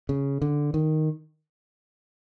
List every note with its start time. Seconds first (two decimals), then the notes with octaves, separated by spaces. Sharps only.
0.09 C#3
0.42 D3
0.74 D#3